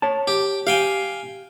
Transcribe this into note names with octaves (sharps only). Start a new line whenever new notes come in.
C#5 A5
G4
G4 F5 G5 G#5